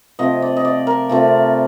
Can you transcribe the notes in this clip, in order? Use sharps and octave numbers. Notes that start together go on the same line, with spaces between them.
C3 F3 A3 D#5
D5
D#5
D5
A#4
C3 F3 A3